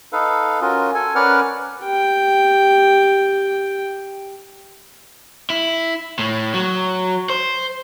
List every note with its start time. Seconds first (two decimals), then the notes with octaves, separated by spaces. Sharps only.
0.13 D#4 A4 B4 F5
0.61 C#4 F4 F#4 A#4
0.94 A4 G#5
1.15 C#4 A#4 B4 D5 F#5 F6
1.83 G4 G5
5.50 E4
6.19 A2
6.54 F#3
7.30 C5